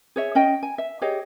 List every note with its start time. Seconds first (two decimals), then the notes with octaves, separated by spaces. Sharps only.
0.16 G#4 C#5 E5
0.35 C#4 D#5 G5
0.63 G#5
0.78 E5
1.02 G4 G#4 C#5 D#5